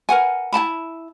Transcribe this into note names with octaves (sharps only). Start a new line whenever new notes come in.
A#4 B4 F#5 G#5
E4 G5 A5 B5